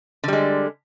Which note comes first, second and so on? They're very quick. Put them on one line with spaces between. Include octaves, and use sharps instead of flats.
D3 G3 G#3